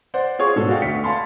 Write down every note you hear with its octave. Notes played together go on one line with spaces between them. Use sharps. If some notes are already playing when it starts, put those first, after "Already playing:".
C5 D5 F#5
F4 G#4 C#5 G#5 C#6
G#2 B2 A4
F#4 D5 F5 G5
D2 B6 C#7
F5 G#5 A5 B5 C6